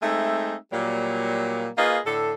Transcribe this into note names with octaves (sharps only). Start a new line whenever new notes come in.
G#3 A3 C4 D#4 E5
A#2 F#3 G3 A#3
A#3 F4 G#4 B4 D#5
A2 D3 A4